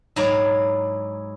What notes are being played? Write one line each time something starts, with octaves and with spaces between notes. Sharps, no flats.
G#2 F#3 E4 D5 A#5